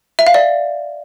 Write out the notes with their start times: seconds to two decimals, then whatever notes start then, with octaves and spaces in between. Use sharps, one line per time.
0.19 E5
0.27 F5
0.34 D5